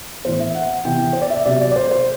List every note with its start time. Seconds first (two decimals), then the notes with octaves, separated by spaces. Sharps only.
0.24 A2 E3 B3 E4 C5
0.40 E5
0.55 F#5
0.85 C3 E3 B3 E4 G5
1.13 C5
1.22 D5
1.30 E5
1.45 C3 F#3 B3 D5
1.61 D5
1.72 D5
1.76 C5
1.91 C5